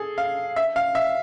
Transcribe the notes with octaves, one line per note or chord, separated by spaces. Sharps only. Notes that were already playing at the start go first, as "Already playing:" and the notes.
Already playing: G#4 A4
F5
E5
F5
E5